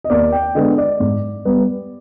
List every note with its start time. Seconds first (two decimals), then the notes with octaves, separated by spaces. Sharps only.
0.04 D#5
0.10 D#2 D5
0.32 G5
0.55 D3 G#3 B3 D#5
0.78 D5
1.00 G#2
1.45 G3 B3